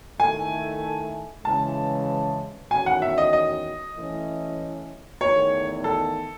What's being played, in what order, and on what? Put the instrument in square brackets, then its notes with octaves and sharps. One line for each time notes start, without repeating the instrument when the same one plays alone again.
[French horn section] D#3 A3 E4 A4 [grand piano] G#5
[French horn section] C#3 E3 G#3 [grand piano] A5
[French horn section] E2 D#3 A3 C#4 F#4 [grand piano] G#5
[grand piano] F#5
E5
D#5
D#5
[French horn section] E3 A3 C#4 E4
[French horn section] E2 D#3 A3 [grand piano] C#5
[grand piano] A4